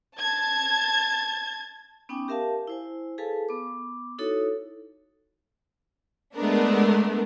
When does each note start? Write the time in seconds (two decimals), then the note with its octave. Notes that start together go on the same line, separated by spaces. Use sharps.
0.17 A5 G#6
2.09 B3 C#4 D#4 G5 G#5 D6
2.28 G4 A#4 E5 F5 A5
2.67 E4 C5 G#5
3.18 G#4 A4 B4 F5 G#5 A5
3.49 B3 D6
4.19 D#4 E4 F#4 A4 C#5
6.36 G#3 A3 B3 D4 A#4